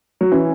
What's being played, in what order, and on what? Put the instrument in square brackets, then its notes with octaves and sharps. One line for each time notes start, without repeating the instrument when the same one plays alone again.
[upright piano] F#3
[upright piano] E3 [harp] C#4